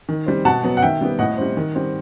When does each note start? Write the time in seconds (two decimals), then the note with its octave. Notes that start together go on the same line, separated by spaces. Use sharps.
0.09 D#3
0.26 G3 C4
0.45 B2 F#5 A5
0.64 F#3 B3
0.77 F#5
0.82 D#3 E5 G5
1.01 G3 B3
1.19 A2 D#5 F#5
1.37 G3 C4
1.57 D#3
1.75 G3 C4